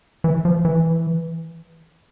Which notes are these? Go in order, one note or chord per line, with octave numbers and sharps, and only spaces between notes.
E3
F3
E3